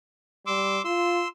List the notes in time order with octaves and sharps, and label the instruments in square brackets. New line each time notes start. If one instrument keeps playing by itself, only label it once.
[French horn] G3 [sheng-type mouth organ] C6 D6 E6
[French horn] F4 [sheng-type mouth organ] C6 E6